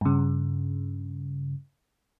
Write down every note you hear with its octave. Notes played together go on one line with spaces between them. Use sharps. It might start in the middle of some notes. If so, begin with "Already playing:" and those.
G2 C#3